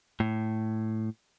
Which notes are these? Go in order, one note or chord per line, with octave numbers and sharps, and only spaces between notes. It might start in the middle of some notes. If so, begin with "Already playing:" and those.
A2